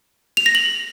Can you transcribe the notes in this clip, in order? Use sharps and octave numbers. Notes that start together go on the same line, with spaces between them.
F7
A#6
F#7